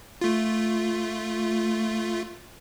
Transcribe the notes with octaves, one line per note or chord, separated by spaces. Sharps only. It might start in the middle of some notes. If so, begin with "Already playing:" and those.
A3 F4